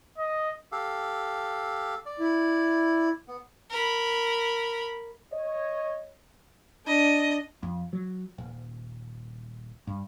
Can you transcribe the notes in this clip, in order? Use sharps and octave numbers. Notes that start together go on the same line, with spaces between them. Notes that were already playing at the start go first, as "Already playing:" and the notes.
D#5
G4 A4 F5
D5
E4
B3
A#4 B5
C#5 D#5
D4 D#5
F2
F#3
D#1
G2